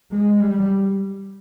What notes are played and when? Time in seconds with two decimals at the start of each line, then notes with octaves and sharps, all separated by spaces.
0.11 G#3
0.40 G3